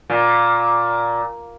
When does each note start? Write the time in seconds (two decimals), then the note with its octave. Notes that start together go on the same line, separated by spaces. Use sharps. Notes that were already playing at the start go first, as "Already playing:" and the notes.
0.10 A#2